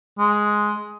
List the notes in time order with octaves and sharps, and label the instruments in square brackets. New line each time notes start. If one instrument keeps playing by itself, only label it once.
[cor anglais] G#3